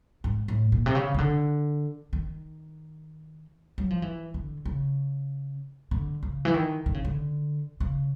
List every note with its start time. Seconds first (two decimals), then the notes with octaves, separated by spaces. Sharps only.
0.24 G#2
0.48 A2
0.72 A#2
0.86 C3
0.95 C#3
1.14 C#3
1.18 D3
2.13 D#3
3.78 F#3
3.90 F3
4.02 E3
4.34 D3
4.65 C#3
5.91 D3
6.23 C#3
6.45 E3
6.54 D#3
6.86 D3
6.94 C#3
7.05 D3
7.80 C#3